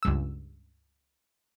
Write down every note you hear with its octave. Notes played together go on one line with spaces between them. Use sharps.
C#2 G2 E6